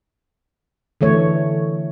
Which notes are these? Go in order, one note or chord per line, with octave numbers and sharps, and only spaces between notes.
D3 E3 A3 C#5